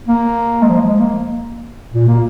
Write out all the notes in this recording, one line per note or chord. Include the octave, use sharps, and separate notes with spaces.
A#3
G#3
F3
G#3
A#3
A#2
A#3